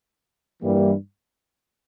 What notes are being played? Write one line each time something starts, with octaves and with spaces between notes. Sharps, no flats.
G2 E3 G3 A#3